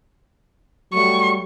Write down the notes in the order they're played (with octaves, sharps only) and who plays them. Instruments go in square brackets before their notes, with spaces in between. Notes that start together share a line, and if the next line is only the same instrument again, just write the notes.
[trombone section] F#3 G3 A3 [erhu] C#6